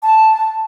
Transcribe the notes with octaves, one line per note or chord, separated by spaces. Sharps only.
A5